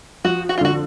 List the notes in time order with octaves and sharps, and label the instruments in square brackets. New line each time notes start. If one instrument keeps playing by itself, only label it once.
[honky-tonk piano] F3 [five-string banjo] F#4
[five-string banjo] F#4
F4
[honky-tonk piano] D3 [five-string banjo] F#4